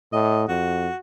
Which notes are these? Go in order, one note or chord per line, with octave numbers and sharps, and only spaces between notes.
A2 D#5
F2 F#4